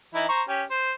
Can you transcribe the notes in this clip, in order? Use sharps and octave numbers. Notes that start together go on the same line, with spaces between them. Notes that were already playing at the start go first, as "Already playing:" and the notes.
E3 D#4 E4
C5 A#5 C#6
C#4 G4
C5